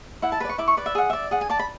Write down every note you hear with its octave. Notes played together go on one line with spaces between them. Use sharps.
E4 F#5
A5
B4 D5 B5
C#6
E4 D6
C#6
B4 D5
E5
G#4 F#5
D5 E5
G#4 F#5
G#5
D5 A5
B5